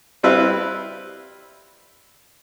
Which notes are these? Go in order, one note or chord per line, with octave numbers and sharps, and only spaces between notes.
G3 C4 E4 B4 E5 F5